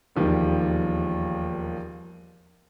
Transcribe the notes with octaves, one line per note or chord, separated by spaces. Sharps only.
E1 D#2 F3 G3 D#4